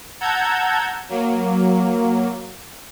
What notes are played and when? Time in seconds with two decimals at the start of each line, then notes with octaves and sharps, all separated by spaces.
0.21 F#5 A5 A#5 E6 G6 G#6
1.09 F#3 A#3